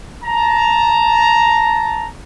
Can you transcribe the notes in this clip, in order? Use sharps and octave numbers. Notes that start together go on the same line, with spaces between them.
A5 A#5